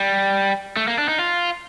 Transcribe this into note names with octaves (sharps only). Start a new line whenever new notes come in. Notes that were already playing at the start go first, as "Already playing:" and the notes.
Already playing: G3
A3
A#3
D4
D#4
F4